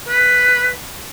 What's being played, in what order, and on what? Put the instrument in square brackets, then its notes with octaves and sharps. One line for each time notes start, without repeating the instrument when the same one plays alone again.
[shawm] B4